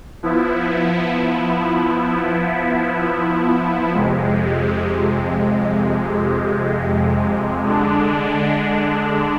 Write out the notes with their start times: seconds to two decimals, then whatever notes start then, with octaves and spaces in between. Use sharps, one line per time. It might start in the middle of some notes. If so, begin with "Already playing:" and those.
0.23 F3 B3 E4
3.94 F2 C3 G#3
7.64 D3 G#3 D4